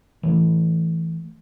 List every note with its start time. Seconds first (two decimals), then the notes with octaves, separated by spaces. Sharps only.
0.23 E3 A3